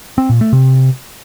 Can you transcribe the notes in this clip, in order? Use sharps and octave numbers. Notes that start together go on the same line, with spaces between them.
C4
A#2
A3
C3